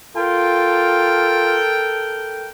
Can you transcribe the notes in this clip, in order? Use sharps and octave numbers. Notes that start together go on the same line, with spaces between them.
F4 A4 A#4 G5